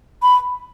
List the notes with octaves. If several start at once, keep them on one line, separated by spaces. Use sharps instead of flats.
B5